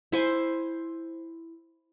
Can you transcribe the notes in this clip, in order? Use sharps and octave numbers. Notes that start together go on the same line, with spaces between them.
E4 C5 G#5